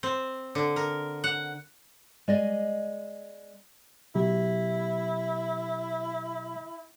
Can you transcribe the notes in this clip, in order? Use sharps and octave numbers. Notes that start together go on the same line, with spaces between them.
C4
D3
A#4
F#5
G#3 D5 D#5
B2 F#3 E4 G4